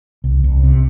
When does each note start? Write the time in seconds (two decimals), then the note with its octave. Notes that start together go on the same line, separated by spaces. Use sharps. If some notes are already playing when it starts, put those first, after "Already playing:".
0.24 C2
0.44 C2
0.64 C3